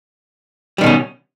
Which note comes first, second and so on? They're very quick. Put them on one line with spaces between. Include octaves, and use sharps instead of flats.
G3 D#3 B2 C#4